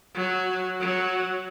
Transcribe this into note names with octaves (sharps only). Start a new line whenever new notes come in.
F#3
F#3